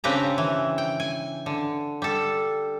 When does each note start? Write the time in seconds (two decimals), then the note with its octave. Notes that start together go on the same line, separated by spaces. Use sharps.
0.04 C#3 C4 D4 G4 B4 A#5
0.38 E3
0.78 G5
1.00 G#5
1.46 D3
2.02 G3 A4